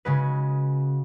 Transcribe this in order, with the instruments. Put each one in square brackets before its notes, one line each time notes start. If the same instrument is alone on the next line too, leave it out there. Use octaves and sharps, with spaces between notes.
[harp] C#3 G#3 C#4 F#4 B4